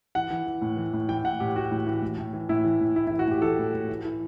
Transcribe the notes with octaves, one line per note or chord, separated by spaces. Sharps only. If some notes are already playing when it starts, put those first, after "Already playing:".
E3 F#5
E3
E3
A2
E3
A2
E3 G5
A2 F#5
A2 G4
E3 F#4
A2
E3
A2
A2
E3
A2 E4
E3
A2
A2 E4
E4
E3
F#4
A2 G4
E3 A4
A2
A2
E3
E3